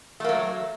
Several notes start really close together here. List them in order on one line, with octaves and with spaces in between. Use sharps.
A3 A#3 F#3